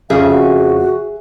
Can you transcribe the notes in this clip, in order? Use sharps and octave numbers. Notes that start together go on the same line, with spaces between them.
F2 C#3 G#4 E5 F5
F#4